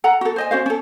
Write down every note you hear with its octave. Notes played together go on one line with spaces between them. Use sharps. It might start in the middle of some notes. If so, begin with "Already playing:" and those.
A4 F#5 A#5
F#4 A4
C5 D#5 G#5
C#4 F#4 C5 F5
C#4 A4